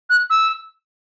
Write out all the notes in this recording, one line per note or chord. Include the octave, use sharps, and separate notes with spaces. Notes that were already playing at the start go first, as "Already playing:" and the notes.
F#6
E6